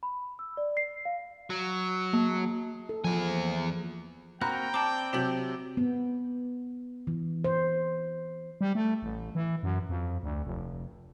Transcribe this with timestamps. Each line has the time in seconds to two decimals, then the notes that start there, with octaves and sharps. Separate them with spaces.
0.03 B5
0.39 E6
0.57 D5
0.77 C7
1.05 F5
1.50 F#3
2.13 A#3
2.89 A4
3.04 E2 F3 G#4
4.41 A#3 C4 F#4 G5 A#5 B5 F#6
4.74 C4 D5 A5 D6
5.13 C3 F#3 G4 B6 F#7
5.77 B3
7.07 E3
7.44 C5
8.61 G3
8.75 A3
9.02 A1
9.35 E3
9.63 F#2
9.89 F2
10.23 D2
10.45 F1